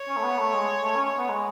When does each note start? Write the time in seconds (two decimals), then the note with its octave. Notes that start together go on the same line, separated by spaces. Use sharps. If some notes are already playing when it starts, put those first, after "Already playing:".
Already playing: C#5
0.08 C#4
0.17 A3
0.23 B3
0.38 A3
0.53 G#3
0.83 A3
0.95 C#4
1.18 B3
1.29 G#3